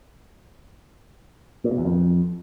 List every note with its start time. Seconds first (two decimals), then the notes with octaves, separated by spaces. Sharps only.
1.64 A#2
1.71 B2
1.78 E2
1.85 F2